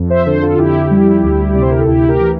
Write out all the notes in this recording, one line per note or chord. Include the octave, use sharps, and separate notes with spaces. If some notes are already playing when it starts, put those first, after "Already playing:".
Already playing: F2
C5 E5
D3 A4 C5
F4 A4
F2 E4 G4
G3
D2
C3 D5
C5
A#4
A4
D2 E4 G4
G4 A#4
E3